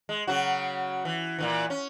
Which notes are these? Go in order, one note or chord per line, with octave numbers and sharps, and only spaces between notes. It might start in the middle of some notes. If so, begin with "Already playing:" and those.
G#3
C#3 F#3 F#4
E3
A#2 D#3 E3
C#4